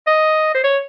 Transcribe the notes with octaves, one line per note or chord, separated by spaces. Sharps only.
D#5
C5
C#5